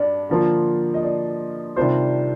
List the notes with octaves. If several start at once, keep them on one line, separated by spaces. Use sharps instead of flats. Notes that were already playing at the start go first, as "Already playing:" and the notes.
Already playing: G2 D4 D5
D3 F3 A#3 F4
D#5
D5
C3 D#3 G3 D4 F4 C5